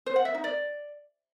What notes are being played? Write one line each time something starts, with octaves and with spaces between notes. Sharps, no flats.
C5
F#5
E5
D#4
D5